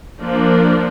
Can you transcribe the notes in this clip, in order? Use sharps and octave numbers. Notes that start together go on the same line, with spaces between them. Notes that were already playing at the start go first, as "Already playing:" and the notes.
F3 A#3 D4